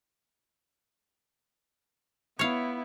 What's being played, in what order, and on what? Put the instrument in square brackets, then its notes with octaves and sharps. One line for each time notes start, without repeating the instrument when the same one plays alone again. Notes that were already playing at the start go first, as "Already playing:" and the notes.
[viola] B3 E4 [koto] C#5 F5